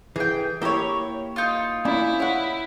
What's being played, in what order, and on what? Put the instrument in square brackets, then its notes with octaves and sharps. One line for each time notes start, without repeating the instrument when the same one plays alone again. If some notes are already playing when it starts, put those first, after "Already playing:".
[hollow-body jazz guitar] E3 [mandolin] G#4 G5
[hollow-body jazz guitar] A#3 E4 G4 [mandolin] C#5 D#5
[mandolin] D#4 F4
[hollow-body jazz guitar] A#3 C#4 D4 [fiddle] E4
[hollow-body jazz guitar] C#5 F#5